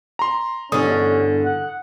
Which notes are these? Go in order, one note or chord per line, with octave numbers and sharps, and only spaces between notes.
A#5 C6
E2 G2 D3 C#4 D#6
F#5